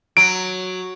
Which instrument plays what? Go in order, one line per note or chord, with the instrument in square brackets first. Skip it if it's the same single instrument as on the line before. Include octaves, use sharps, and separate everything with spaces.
[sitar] F#3 [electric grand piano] D7